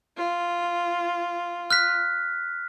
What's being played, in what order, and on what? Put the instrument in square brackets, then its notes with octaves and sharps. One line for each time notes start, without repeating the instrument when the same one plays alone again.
[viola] F4
[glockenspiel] F6 F#6 B6